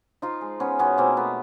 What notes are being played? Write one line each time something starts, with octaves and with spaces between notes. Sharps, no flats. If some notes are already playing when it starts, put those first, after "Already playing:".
F3 D#4 F4
G#3
F3 B3 C#4
B2 B3 C#4
B2 A#3 C4
A3 B3